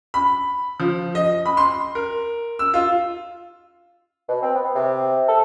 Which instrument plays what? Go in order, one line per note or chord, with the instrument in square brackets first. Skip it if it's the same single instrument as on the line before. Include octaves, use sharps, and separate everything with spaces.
[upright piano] B5
F3
D#5
B5
C6
A#4
E6
F4
[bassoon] B2
C4
B3
C3
A4